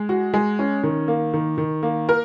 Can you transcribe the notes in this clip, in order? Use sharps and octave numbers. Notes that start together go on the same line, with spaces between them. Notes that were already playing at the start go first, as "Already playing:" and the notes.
Already playing: G#3
F#4
G#3
C#4
D#3
A#3
D#3
D#3
A#3
A#4